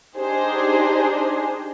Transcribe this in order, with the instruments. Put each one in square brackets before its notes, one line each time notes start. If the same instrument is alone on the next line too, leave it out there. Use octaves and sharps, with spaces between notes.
[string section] D4 D#4 G4 G#4 C5